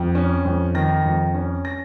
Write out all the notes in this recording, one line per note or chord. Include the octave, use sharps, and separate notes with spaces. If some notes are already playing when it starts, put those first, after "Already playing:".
Already playing: F2
C#4
F2
D#3 A#6
F2
C#4
A#6